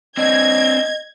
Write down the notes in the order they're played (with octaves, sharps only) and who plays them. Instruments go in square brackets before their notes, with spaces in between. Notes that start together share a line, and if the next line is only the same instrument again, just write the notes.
[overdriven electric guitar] C4 D4 [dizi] D#5 [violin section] G#6